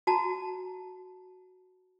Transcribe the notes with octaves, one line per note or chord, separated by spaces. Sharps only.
F#4 A5 A#5